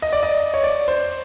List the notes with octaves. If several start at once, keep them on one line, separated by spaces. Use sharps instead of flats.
D#5
D5
D#5
C#5
D5
C5